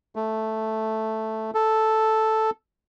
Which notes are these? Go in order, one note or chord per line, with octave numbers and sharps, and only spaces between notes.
A3
A4